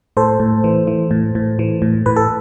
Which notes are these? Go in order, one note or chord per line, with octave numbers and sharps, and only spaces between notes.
A2 A4 C5
A2
E3
E3
A2
A2
E3
A2
A2 B4
A4